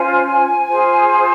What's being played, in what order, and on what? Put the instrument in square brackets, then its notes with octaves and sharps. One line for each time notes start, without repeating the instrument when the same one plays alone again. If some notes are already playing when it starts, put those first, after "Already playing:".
Already playing: [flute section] C#4 F4 C5 G#5
F4 G#4 C5